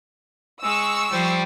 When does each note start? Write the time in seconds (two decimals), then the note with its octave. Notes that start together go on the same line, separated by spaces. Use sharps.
0.62 G#3 C#6 E6
1.12 F3 G3 C5